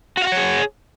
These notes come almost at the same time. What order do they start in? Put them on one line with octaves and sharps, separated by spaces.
F#4 F5 F#5 C#5 G#4